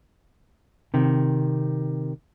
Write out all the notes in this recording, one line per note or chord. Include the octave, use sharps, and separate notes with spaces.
C3 D#3